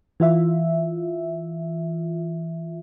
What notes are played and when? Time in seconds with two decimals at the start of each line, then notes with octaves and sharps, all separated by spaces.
0.20 E3 F4 E5